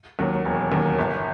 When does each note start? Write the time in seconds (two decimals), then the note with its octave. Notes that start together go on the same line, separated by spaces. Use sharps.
0.19 D#2 D#3 F#3 A#3
0.45 E1
0.72 D#2 D#3 F#3 A#3
0.99 G1